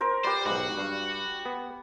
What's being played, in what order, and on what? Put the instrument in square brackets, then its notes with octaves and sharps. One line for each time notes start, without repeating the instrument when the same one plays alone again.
[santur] A#4 C5
[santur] G4 B4 [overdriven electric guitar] C5 [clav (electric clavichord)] D5
[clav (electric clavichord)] B1 G#2 [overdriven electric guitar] F#4
[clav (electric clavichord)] G2 F5
B3